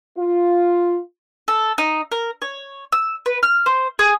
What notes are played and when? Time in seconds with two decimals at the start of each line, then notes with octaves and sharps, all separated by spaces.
0.18 F4
1.48 A4
1.78 D#4
2.12 A#4
2.42 C#5
2.92 E6
3.26 B4
3.43 F6
3.66 C5
3.99 G#4